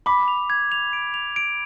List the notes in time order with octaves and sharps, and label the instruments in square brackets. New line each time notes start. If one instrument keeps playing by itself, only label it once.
[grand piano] B5 [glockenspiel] D6
[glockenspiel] F7
G#6
F7
D7
F7
D7